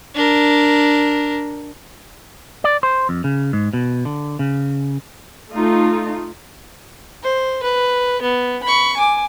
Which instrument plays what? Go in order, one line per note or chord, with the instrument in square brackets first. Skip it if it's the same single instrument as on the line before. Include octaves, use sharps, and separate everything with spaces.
[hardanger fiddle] D4 A#4
[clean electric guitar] D5
C5
F2
C#3
G#2
B2
D3
C#3
[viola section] A3 D#4 F4
[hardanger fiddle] C5
B4
B3
B5 C#6
G#5 D6